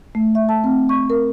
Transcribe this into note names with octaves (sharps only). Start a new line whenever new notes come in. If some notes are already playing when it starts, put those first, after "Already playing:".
A3
E5
A5
C4
C#6
A#4